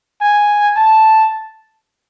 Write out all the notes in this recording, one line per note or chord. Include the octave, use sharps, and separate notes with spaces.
G#5
A5